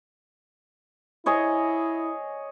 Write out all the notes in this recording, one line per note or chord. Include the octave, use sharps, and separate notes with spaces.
E4 G#4 C#5 D#5